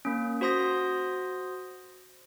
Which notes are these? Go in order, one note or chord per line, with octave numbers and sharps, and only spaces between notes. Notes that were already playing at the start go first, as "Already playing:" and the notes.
A#3 C#4
F#4 C5 C6 D#6 A#6